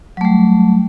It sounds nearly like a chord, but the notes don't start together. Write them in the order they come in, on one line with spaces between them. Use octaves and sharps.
F#3 A3 G3